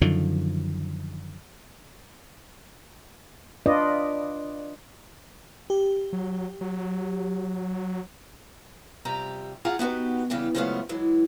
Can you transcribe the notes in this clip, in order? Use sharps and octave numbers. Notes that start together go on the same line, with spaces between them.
F#2 D3 D#3 F3
D4 F4 B4 D5 D#5
G4
F#3
F#3
F2 C3 G3 G4 A#5
F2 F4 G#4 F#5 A#5
B3 D#4 F#4 G4 B4
C#3 E3 G3 B3 G4
C#3 F3 F#3 G#3 A3 B3
E3 F#3 G#3